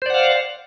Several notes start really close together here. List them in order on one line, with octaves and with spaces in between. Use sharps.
C5 D5 F#5 F5